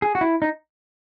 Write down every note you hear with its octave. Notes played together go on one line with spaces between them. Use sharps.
G#4
F#4
E4
D#4